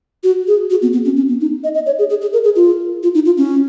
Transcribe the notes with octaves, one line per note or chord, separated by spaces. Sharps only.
F#4
G#4
F#4
B3
B3
C#4
C#4
B3
D#4
D#5
D#5
C#5
G#4
G#4
G#4
A#4
G#4
F4
F4
D#4
F4
C#4